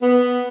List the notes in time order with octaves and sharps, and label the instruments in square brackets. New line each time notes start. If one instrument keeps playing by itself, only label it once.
[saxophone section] B3